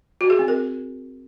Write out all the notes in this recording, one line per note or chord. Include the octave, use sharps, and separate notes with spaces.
F#4
G#4
C4
A#4